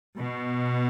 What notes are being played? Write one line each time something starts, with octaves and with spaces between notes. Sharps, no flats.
B2